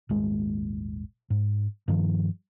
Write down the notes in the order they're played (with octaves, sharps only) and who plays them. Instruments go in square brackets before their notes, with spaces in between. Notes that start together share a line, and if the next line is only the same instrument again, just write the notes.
[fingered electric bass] D#1 G#1 G#3
G#2
G2 D#3 F3